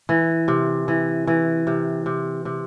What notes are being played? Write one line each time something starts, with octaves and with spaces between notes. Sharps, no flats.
E3
C3
E3
E3
C3
C3
C3